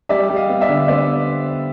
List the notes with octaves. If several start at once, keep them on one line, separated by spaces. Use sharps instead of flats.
G3 D5 E5
G3
D#5 F5
B3
D5 E5
D3
B3 C5 D5